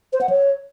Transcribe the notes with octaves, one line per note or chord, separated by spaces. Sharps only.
C5
F#5
C#5